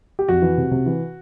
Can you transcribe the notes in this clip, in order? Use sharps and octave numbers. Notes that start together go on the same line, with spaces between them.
G4
F2 F#4
E3
C3
C3
E3